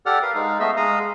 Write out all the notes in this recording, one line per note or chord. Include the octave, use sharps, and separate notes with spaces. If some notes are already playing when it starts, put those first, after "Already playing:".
G4 A4 D5 F#5 F6
A#4 B4 F5
G#3 D#4 F5
A3 B3 D#5 E5 E6
G#3 F5 A#5 D#6